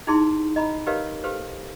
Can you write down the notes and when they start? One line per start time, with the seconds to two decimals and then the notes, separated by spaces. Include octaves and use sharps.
0.07 D#4 E4 G#4 A5 C6
0.56 D#5 A#5 B5
0.86 G4 A#4 B4 C#5 D#5 F5
1.24 G4 A4 B4 C5 F5